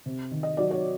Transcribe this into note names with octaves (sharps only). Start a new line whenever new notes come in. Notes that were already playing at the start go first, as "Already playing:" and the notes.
C3
D#3
D#5
F#3 D5
C#5